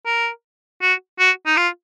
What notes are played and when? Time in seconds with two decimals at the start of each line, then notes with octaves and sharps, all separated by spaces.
0.06 A#4
0.82 F#4
1.19 F#4
1.46 D#4
1.57 F4